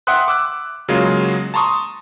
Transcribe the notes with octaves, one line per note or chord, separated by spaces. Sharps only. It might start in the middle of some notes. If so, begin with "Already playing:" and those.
E5 F#5 G5 C6 D#6 F#6
D6 E6 F#6
C#3 F#3 G#3 A#3 F4
A5 A#5 C6 C#6 D#6